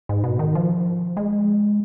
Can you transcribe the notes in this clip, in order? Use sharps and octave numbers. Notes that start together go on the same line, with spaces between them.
G#2
B2
D#3
F3
G#3